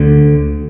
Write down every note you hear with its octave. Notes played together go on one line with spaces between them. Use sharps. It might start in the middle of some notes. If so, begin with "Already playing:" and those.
Already playing: D2 D3